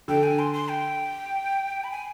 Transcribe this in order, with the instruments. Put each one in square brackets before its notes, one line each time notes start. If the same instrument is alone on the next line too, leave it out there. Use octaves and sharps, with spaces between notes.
[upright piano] D3 [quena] G5
[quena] G#5
C6
C6
G5
B5
G#5